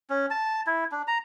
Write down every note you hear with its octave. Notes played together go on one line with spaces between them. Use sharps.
C#4
A5
E4
D4
A#5